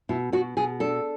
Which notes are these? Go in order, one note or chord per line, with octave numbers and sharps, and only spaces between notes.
B2 E4
B2 F#4
B2 G#4
D4 A4